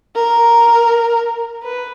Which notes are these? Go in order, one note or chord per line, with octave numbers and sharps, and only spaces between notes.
A#4
B4